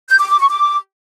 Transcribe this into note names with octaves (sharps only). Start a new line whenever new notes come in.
G6
D6
D6
C#6
D6